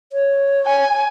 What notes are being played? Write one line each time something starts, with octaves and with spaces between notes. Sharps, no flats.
C#5
G#5